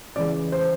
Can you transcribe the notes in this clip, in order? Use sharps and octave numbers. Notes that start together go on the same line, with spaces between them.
C#3 E3 G#3 D5
C5